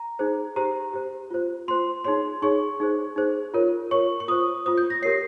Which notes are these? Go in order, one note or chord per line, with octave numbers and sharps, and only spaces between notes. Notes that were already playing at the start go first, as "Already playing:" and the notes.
Already playing: A#5
D#4 G#4 C5
G4 C5 A#5
G4 C5
F4 C5
F4 C5 C6
D#4 G#4 C#5 C6
D#4 G#4 C#5 C#6
D#4 G#4 C5
D#4 G#4 C5
F4 A#4 C#5
F4 A#4 C#5 C#6
C#6
F4 C5 D#6
F4 C5 D#6
G6
A#6
G4 A#4 C#5 C7